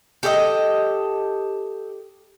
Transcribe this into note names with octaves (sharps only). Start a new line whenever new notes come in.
G4 A4 D5 D#5